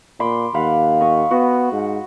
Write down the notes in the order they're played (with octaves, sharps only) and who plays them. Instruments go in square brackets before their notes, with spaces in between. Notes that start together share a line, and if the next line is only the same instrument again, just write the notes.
[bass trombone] A#2 [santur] B5 C6 D6
[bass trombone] D#2 [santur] B4 F5 F#5
[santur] D#5 C#6
[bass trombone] B3 [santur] F#4
[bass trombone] G#2